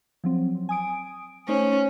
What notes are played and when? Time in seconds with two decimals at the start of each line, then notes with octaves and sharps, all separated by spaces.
0.24 F3 F#3 C4
0.69 G#5 D#6 D7
1.48 A3 C#4 D#4 C5